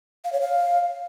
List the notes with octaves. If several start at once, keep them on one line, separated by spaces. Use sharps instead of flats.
F5
C#5
F5